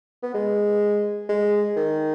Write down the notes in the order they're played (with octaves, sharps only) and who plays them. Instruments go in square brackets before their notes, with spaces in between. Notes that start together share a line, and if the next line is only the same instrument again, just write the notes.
[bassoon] B3
G#3
G#3
D#3